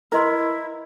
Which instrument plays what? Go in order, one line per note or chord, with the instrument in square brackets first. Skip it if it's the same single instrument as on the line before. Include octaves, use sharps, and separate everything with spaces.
[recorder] E4 [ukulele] A#4 [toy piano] B4 D#5 C6